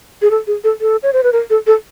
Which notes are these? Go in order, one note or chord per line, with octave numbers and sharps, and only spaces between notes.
G#4
A4
G#4
A4
A4
C#5
C5
B4
A#4
A4
A4